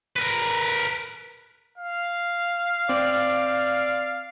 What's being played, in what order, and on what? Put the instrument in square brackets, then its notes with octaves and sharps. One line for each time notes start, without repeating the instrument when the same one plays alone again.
[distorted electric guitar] A#4 B4
[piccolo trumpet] F5
[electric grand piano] C4 [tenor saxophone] D5